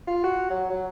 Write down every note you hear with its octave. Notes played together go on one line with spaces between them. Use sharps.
F4
F#4
F#3
F#3